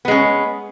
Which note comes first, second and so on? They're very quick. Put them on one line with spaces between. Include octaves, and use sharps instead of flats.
B3 G#3 C#4